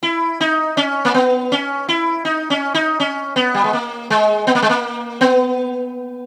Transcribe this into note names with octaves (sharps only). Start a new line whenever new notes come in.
E4
D#4
C#4
A#3
B3
C#4
E4
D#4
C#4
D#4
C#4
B3
G3
G#3
A#3
G#3
B3
A#3
G#3
A#3
B3